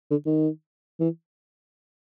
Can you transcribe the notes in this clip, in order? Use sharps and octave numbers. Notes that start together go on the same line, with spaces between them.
D3
D#3
E3